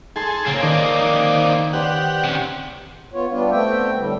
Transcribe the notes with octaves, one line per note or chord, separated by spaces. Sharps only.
D#4 G#4 A4 C6
C#3 A#3 C4
D#3 D#4 D5
G4 B4 C5 D5 F#5
C3 C#4
B3 F4 C#5
G3 B3 D4 F4
A3 B3 C4 E5 G5
A2 D3 G3